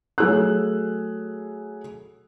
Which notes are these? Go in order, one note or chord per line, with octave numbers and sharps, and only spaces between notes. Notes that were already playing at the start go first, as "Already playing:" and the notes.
F#3 A3 G#4 E6 F#6